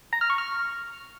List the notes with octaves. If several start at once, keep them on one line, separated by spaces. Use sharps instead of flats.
A#5
F6
C#6
F6